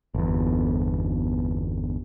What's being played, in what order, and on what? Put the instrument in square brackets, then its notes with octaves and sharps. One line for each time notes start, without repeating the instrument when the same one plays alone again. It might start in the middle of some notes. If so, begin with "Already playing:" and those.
[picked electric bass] G1 E2